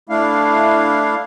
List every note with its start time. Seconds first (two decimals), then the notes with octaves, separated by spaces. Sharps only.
0.09 A3 D4 E4 F5